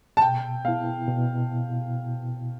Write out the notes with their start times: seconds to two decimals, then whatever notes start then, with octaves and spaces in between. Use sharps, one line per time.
0.17 A5
0.22 B2 G5
0.65 B3 E4 F5
1.08 B2